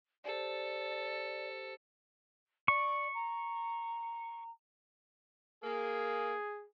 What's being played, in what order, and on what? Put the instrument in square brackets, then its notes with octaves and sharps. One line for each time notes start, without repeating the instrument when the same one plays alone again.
[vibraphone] G4 C5 [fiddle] A4 [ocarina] D5
[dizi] D5 [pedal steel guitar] C#6
[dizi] A#5
[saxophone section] A#3 [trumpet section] G#4